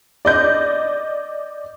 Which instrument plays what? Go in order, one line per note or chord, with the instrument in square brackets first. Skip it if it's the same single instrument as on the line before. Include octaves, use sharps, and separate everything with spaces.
[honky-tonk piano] D5 D#5 G6